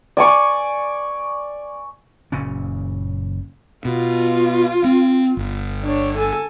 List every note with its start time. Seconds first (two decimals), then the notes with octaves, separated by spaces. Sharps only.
0.17 D5 G#5 C#6
2.32 F#1 A#2 C#3 C#4
3.85 B2 F4
4.84 C4
5.37 G1
5.84 D4 C#5
6.18 A4 G#5